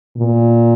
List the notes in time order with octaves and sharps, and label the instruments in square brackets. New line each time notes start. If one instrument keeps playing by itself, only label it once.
[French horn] A#2